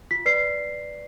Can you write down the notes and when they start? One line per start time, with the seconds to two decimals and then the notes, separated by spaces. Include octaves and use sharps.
0.11 F4 B6
0.25 B4 D5 C7